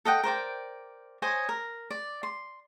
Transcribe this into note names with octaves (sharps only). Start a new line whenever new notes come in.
A4 D#5 F#5 G5
A#4 C5 D5 G5
C5 C#5 D#5 G#5
A#4
D5
C6